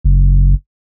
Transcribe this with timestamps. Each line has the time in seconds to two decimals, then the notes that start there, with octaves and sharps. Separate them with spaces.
0.04 F#1